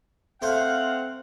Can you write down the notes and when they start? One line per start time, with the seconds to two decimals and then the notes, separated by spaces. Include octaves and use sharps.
0.42 A3 C4 C5 F5 F#5